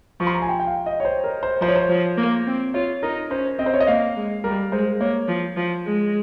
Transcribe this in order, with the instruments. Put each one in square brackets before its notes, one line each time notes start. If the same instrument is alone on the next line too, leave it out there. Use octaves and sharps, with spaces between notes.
[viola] F3 [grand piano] C#6
[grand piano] C6
A#5
G#5
G5
G5
F5
D#5
C#5
C5
A#4
C5
[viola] F3 [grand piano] C5
[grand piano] C#5
C5
[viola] F3
A#3
C4
[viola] F4 [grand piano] C#5
[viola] D#4 [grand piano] A#4
[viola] C#4 [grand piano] C5
[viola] C4 [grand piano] D#5
[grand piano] C5
C#5
D#5
[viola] A#3 [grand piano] F5
[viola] G#3
[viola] G3 [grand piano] A#4
[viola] G#3 [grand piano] C5
[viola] A#3 [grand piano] C#5
[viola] F3
F3
G#3